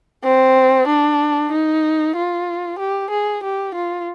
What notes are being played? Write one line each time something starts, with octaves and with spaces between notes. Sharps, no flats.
C4
D4
D#4
F4
G4
G#4
G4
F4